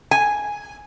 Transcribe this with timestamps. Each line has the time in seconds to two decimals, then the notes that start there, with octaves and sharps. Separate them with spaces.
0.11 G#5